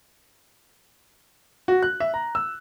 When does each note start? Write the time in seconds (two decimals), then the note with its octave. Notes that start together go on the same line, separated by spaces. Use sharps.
1.68 F#4
1.83 F#6
2.00 E5
2.14 A#5
2.35 E6